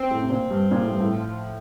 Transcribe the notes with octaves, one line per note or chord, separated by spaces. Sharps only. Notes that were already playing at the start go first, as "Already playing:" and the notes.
Already playing: C4
A2
C3
A#2 C4
G2
A#2 F3
A2
G2
A2
F3